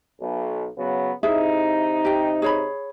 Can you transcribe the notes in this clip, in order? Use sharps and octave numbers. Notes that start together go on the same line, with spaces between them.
B1
C#3 F#3 B3
C3 D#4 E4 G#4 E5
G4 G5
G#4 C#5 B5